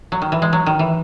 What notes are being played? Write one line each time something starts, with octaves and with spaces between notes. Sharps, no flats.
F#3
D#3
E3
G#3
F#3
D#3
E3